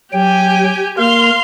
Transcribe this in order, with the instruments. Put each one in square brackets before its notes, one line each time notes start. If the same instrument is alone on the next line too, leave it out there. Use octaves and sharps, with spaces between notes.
[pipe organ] F#3 G5 [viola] G4 G#5
[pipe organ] A#3 A#4 [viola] F5 C6